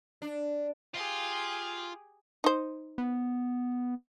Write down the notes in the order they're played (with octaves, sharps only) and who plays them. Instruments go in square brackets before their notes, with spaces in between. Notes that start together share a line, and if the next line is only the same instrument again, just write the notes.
[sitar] D4
[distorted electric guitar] F4 [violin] G4 G#4
[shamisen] D#4 C5
[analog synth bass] B3